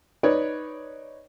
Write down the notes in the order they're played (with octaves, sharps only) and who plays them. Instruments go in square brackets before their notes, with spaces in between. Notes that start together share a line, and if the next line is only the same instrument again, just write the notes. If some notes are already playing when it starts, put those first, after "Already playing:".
[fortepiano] D#4 B4 C#5 D5